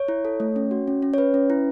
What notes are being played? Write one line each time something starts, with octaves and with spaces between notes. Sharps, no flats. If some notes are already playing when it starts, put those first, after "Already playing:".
Already playing: C#5
E4
A4
A3
C#4
F#4
C#4
C#4
C#5
C#4 B4
C#4
E4